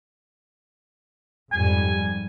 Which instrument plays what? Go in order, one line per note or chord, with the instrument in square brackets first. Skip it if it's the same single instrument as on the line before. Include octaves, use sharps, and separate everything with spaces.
[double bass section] F2 G#2 G3 [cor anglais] G#5